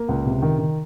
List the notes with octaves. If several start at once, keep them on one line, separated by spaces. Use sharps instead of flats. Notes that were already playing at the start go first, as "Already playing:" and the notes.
Already playing: A#3
C#2
C3
D#3
D#3